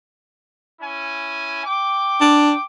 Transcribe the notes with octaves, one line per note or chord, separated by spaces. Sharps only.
C#4 E4 G#5
G5 D6
D4